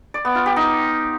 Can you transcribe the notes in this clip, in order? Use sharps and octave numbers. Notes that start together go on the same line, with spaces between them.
D5
B3
F4
G4
D#4